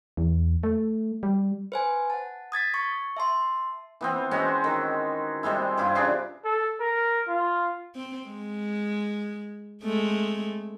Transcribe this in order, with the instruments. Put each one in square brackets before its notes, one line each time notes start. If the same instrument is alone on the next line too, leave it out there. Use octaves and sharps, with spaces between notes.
[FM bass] E2
A3
G3
[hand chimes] B4 C5 G#5
F#5 A5
D#6 G#6 A6 B6
C#6
E5 A5 C6
[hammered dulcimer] E3 B3 C4
G#3 C4 C#4 F#4
D#3
C3 G3 G#3 E4
G2 C3 E4 F4
C#3 D4 G#4
[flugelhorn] A4
A#4
F4
[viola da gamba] C4
G#3
G#3 A3 C4